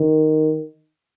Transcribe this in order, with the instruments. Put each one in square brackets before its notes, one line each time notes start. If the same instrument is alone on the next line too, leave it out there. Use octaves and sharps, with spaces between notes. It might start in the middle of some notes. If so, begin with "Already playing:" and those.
Already playing: [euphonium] D#3